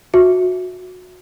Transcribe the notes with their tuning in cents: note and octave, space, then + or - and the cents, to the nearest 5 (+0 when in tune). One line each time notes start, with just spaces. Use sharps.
F#4 -20 E5 +0